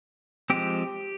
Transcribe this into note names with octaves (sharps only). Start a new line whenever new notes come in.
F3 G#3 C4 G4